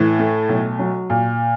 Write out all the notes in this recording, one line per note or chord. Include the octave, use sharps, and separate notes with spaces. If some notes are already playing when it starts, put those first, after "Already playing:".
Already playing: A2 E3
A3
B1
F#3
A#2